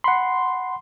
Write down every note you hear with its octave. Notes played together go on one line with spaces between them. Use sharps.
F#5 B5 C6